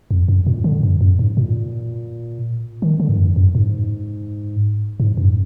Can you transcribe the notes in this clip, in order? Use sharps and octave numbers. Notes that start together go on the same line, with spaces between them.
F2
F#2
A#2
D3
F#2
F#2
G#2
A#2
D#3
D3
G#2
F#2
F#2
G#2
G#2
F#2